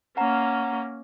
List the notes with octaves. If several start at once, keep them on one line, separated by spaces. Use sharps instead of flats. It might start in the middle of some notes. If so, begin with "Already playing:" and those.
A#3 C#4 F#5 A#5